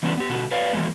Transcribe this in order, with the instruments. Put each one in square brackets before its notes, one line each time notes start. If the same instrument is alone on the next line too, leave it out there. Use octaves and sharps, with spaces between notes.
[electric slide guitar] E3 F#3 A3 B3 C#4 D4
B3 G4
B2 D3 F#4
B4 C#5 D5 F5
D#3 E3 F#3 G#3 A3 B3